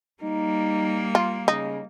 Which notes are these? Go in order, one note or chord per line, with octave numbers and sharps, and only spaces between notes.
G3 A#3 D#4
F4
C#3 D#4